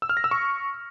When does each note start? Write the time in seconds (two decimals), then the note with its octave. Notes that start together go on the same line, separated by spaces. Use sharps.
0.02 E6
0.09 F6
0.17 A#6
0.24 E6
0.31 C#6